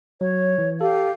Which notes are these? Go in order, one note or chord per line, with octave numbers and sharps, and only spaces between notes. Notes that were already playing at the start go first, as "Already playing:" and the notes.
F#3 C#5
E3
G4 A4 F5